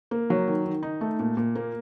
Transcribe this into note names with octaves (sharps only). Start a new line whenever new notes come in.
A#3
F#3
D#3
D#3
D#4
A3
A#2
A#2
A#3